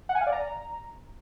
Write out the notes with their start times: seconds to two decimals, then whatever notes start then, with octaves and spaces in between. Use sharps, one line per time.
0.09 F#5
0.15 G#5
0.21 F5
0.27 D5
0.32 A#5